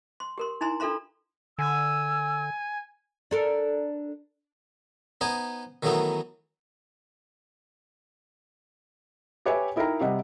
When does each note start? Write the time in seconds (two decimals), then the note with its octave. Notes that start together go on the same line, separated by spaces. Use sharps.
0.20 C6
0.38 G4 A#4 C6
0.61 D#4 E4 G#5 A#5 C6
0.80 D4 F4 A4 F5 A#5 C6
1.58 D3 G#5 E6
3.31 D4 A4 A#4
5.21 B3 D#4 C5 G#5
5.83 D#3 E3 F#3 A3 B3 D#4
9.45 G4 B4 C#5 E5 G5 G#5
9.76 D#4 E4 A#4 D#5 G5 A#5
10.01 C3 G3 D#5 F#5